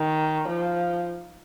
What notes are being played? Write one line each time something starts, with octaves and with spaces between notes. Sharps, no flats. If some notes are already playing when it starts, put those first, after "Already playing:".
Already playing: D#3
F3